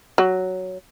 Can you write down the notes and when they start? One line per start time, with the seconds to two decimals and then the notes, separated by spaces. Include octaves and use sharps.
0.18 F#3